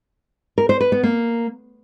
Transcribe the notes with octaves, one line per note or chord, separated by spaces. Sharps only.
A#4
C5
B4
B3
A#3